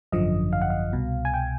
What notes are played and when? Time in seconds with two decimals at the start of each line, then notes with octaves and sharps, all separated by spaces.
0.12 G#1 F#2 D3 F3 D#5
0.53 F5
0.62 F#5
0.70 F5
0.93 C2 B2
1.25 G#5
1.34 G5